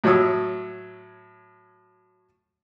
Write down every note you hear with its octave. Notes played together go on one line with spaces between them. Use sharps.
A2 F#3 C#5 D#6 E6